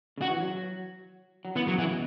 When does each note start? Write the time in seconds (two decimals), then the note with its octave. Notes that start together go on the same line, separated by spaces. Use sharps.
0.18 C#3
0.22 F#4
0.29 E3
0.40 F#3
1.45 F#3
1.55 E3 B3
1.67 C#3 F#3
1.79 C#3 E3
1.91 B2